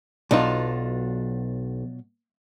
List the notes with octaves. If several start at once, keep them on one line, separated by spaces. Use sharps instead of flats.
B1 B2 F#3 D4 D#4 F4 A5